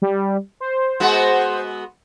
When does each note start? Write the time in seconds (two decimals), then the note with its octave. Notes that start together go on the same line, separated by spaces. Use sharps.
0.02 G3
0.60 C5
1.00 G#3 B3 F#4